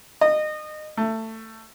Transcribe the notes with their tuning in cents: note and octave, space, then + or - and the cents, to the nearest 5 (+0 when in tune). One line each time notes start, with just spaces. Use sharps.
D#5 -25
A3 +20